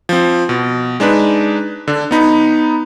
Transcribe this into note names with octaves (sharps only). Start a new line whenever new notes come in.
F3 C4
B2
G#3 D4 D#4 B4
D3 D4
B3 D#4 B5